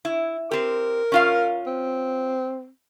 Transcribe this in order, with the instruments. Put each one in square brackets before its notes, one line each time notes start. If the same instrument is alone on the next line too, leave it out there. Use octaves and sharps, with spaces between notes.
[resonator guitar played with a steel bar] E4
[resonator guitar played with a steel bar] C4 G4 [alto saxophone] A#4
[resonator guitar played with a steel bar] C#4 F4 F5
[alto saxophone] C4